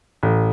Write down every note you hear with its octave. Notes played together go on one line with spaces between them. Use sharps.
A1